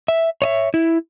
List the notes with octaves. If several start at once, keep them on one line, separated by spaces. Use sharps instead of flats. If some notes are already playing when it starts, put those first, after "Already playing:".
E5
C#5 D#5 E5
E4